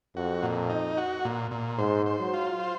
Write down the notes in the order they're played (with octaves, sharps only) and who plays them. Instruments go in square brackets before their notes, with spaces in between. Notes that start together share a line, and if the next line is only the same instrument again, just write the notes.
[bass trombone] F2 [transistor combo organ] F#4
[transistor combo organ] A#2
D#4
F#4
A#2
A#2
[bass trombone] G#2 [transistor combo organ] C5
[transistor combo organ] C5
[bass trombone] F#3
[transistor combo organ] F4
C5